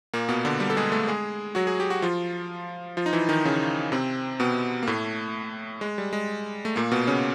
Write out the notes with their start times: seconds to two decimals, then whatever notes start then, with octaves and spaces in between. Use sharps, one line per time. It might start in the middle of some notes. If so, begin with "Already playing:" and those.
0.14 A#2 A#3
0.29 B2 B3
0.45 D3 D4
0.60 G3 G4
0.70 A4
0.77 G#3 G#4
0.92 A3 A4
1.07 G#3 G#4
1.55 F#3 F#4
1.67 G#4
1.80 G4
1.90 F#4
2.02 F3 F4
2.97 F3 F4
3.06 D#4
3.13 E3 E4
3.29 D#3 D#4
3.45 C#3 C#4
3.92 C3 C4
4.40 B2 B3
4.83 A#3
4.87 A2 A3
5.81 G#3
5.98 G3
6.13 G#3
6.65 A3
6.76 A#2 A#3
6.92 B2 B3
7.07 C#3 C#4